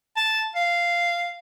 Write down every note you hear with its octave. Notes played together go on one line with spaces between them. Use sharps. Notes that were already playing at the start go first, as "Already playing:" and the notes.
A5
F5